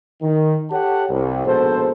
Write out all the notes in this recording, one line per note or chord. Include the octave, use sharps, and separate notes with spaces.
D#3
G4 A4 C#5 F#5 G5 A5
C2
A#1 G#2 B2 A4 C5